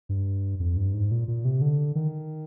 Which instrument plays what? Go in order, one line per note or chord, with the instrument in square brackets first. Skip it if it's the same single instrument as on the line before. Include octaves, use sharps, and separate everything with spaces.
[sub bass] G2
F2
G2
G#2
A#2
A#2
C3
D3
D#3